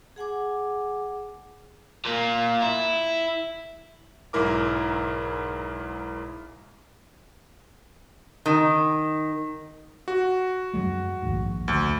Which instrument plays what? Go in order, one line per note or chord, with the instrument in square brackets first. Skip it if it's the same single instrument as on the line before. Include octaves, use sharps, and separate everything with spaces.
[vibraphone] G#4 F#5 G#5 D6
[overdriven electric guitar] A#2 A#3
E4
[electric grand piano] B1 G#2 E4 A#4 D6
[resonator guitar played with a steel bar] D#3
[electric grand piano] F#4
[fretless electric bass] F#2 F#3 G#3
A#1 D#2 G#2
[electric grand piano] D2